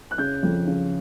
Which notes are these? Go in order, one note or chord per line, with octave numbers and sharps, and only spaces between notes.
F#6
C#3 G6
F2
C#3